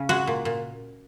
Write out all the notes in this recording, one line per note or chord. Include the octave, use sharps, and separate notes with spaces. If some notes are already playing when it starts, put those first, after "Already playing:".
Already playing: C#3 C#4
G#3 F#4
A#2
A#2